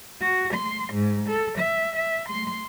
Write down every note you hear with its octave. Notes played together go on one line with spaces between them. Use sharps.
F#4
C6
G#2
A4
E5
E5
C6